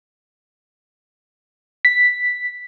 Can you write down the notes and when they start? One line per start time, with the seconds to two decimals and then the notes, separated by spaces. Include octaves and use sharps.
1.85 B6